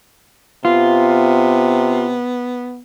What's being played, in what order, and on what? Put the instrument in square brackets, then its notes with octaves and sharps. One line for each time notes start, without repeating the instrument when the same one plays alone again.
[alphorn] C3 [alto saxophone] B3 [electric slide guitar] F4